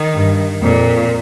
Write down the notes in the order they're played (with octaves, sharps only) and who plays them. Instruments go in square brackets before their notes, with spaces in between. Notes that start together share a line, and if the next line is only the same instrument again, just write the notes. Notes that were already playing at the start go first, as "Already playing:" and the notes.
Already playing: [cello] D#3
[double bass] G2
[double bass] F2 [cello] A#2